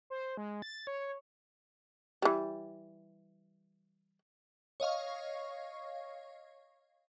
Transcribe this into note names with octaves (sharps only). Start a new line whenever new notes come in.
C5
G#3
A6
C#5
E3 G3
C#5 D#5 F5 C#6